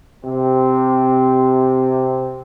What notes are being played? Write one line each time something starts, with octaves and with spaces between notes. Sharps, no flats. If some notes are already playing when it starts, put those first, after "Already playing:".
C3 C4